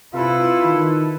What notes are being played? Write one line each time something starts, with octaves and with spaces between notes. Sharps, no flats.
C3 E4 F4 A4 B4
D#3